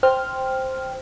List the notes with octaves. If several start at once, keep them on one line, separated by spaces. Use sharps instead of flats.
C5 G5 F6